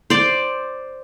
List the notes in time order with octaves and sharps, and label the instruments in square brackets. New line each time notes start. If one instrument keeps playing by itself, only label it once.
[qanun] C5 D5